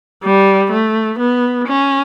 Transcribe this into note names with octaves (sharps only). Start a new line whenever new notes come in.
G3
A3
B3
C#4